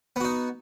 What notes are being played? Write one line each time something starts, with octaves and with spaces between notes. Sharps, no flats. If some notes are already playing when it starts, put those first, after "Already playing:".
B3 D#4 F#4